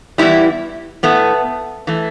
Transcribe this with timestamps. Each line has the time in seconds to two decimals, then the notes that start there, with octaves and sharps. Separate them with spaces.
0.18 E2 E3 G3 E4
1.03 A2 A3 B3
1.87 E3 A3